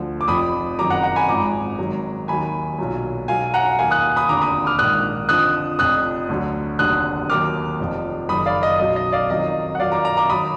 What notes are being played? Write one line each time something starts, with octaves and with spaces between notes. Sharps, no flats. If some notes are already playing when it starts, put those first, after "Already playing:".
Already playing: D2 D3 F3
D6
F1 F2 F3 B5 D#6
F#1 F2 D#3 F#3 A#5 D6
F#5 A#5
F#5 A#5
G#5 B5
G#1 G#2 F3 A#5 D6
G#1 G#2 D#3 F#3
D#2 D#3 F#3 G#5 B5
B1 A#2 F#3
B1 B2 F#3 F5 G#5
F#5 A#5
D#2 D#3 F#3 F5 G#5
D#6 F#6
B5 D#6
F1 D#2 D3 A#5 D6
B5 D#6
D6 F6
A#1 G#2 D#3 D#6 F#6
F2 D3 F3 D#6 F#6
F1 F2 F3 D#6 F#6
D2 D3 F#3
F1 D#2 D3 F#3 D#6 F#6
D#2 D#3 F#3 D6 F6
F1 F2 F3
F#1 F#2 D#3 B5 D#6
D5 F5
D#5
B1 B2 F#3 D#5
D#5
D5 F5
F2 D#3 F#3 D#5
F#5
F2 D#3 F#3 D5 F5
A#5 D6
A#5 D6
A#5 D6
D#3 F#3 B5 D#6